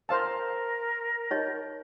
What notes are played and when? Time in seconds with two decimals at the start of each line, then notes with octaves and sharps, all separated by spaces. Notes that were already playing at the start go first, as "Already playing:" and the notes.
0.09 A#4 C5 F5 A5
1.31 D#4 C#5 D#5